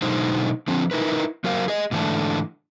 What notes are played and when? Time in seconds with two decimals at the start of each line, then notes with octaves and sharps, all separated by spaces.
0.02 B2 D3 F#3 G#3 D#4 C5
0.68 D3 F3 C4
0.91 D#4 E4 A#4 B4
1.44 F#3 F#4 A#4 C5 F5
1.68 G#4 D#5
1.91 G#2 D3 E3 A3 D4